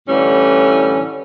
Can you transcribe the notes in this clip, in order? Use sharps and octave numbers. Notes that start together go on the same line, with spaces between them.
A2 D3 E3 G3 C#4